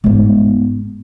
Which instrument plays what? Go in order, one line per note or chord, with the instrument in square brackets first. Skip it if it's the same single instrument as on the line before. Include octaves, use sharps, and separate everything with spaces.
[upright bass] G#2 B3